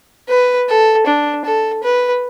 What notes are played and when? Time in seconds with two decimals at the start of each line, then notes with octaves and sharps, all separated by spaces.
0.29 B4
0.69 A4
1.07 D4
1.45 A4
1.83 B4